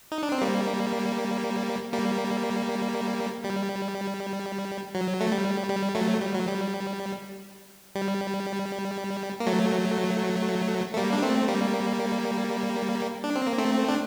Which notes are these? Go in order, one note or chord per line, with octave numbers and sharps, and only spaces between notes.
D#4
D4
C4
G3 A#3
G3 A#3
G3
F#3
A3
G3
G3
F#3 A3
G3
F#3
G3
G3
A#3
F#3 A3
A3
G3 A#3
D4
A3 C4
G3 A#3
D4
C4
A#3
A3 C4
D4